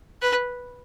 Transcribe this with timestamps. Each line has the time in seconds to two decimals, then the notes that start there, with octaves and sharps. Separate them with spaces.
0.22 B4